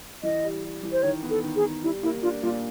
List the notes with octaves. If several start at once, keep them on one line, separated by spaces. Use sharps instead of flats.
E3 D#5
G3
G3
E3
C5
D#3 C#5
B3
A4
D#3
G#4
D#3
G3 E4
A#3 E4
D4 F4
A#2 F4